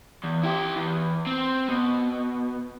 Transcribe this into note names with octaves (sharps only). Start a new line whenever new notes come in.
E2
E4 G4
E2
C4
B2